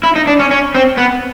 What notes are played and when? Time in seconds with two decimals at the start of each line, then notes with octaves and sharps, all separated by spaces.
0.03 E4
0.16 D#4
0.27 D4
0.39 C#4
0.51 C#4
0.75 C4
0.98 B3